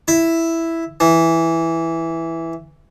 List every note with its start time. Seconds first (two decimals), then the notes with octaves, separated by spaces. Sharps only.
0.08 E4
1.00 E3